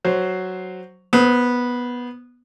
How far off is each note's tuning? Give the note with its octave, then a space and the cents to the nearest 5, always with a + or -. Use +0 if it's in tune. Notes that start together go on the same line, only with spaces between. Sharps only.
F#3 +5 C5 +0
B3 -10 C5 -25 D#6 +25